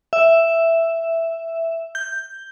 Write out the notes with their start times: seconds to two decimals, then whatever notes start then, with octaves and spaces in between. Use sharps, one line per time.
0.13 E5
1.95 G6